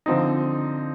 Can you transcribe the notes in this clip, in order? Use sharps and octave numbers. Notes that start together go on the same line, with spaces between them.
D3 F3 C4 D#4